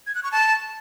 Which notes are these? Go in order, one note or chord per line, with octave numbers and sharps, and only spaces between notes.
G#6
F#6
C#6
A5